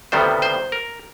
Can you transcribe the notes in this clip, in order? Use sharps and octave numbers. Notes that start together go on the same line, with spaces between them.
D2 C3 D#3 G3 B3 C5
C5
A#4